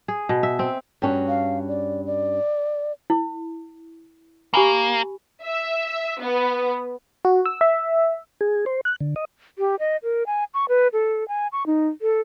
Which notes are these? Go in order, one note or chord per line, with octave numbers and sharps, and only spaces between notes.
G#4
B2
E5
C4
G2 C#4 F#4
F5
D5
D5
E4
A#3 G4 G#5 B5
E5
B3
F#4
E6
E5
G#4
C5
F#6
D3
D#5
G4
D#5
A#4
G#5
C#6
B4
A4
G#5
C#6
D#4
A4